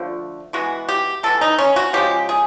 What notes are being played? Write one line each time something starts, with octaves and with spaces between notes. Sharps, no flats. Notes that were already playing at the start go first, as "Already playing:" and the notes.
Already playing: D3 F3 A3
E3 G#3 B3 F#4
G4
E3 G#3 B3 A4
D#4
C#4
F#4
C#3 F3 G#3 G4
G#4